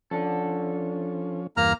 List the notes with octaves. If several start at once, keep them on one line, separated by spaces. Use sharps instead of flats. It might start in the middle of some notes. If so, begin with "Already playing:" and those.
F3 C#4 D4 A4
E2 G2 A#3 A#5 F6